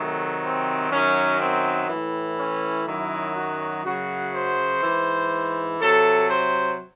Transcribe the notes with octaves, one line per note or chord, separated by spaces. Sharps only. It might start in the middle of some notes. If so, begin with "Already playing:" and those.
Already playing: C3 D#3 F#3 A3
C4
F#2 D#3 F#3 C#4
C4
A2 E3
C#4
F#2 D#3 F#3 E4
F#4
F#2 C#3 F#3 F#4
C5
G#2 E3
C3 F#3 A4
C5